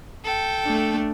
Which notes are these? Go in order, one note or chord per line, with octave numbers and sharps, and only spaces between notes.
A4 G5
A3 D4